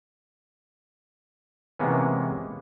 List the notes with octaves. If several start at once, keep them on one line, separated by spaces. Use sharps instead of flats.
C3 E3 G#3 A#3 B3 C#4